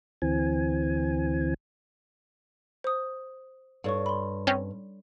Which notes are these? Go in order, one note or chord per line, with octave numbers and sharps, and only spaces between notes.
D2 E3 C4 G#5
C5 D#6
G2 A4 C#5 C#6
B5 C6
C4 C#4